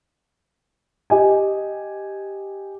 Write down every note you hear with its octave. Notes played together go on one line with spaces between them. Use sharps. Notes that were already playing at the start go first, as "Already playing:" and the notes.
G4 D#5 G#5